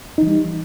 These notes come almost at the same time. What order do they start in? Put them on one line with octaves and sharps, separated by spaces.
D#4 E3 G3